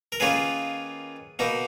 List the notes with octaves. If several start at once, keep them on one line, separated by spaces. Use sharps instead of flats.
A#4
D#3 A#3 C#4 F4 G#4 B4
B2 A#3 D#4